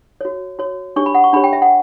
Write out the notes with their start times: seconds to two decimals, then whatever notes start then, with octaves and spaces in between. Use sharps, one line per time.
0.21 F#4 C#5
0.59 F#4 C#5
0.96 D4 G4 C#5 C#6
1.06 B5
1.15 F#5
1.24 C#6
1.33 D4 G4 C#5 B5
1.44 G5
1.53 E5
1.62 F#5